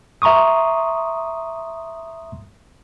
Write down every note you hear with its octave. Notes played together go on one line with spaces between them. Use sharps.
E5 A#5 C6 C#6 D#6